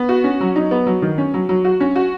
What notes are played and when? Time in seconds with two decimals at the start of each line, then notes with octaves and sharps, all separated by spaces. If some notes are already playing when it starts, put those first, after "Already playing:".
Already playing: B3
0.09 F#4
0.24 C#4
0.41 F#3
0.56 D#4
0.71 B3
0.87 F#3
1.02 D#3
1.18 C#4
1.34 F#3
1.49 F#3
1.65 F#4
1.80 C#4
1.96 F#4